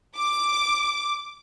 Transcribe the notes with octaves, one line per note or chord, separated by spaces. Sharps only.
D6